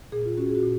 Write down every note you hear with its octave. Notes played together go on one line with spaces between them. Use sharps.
A#2 G#4
F4
C#4 F#4
G#4
F#4
A#2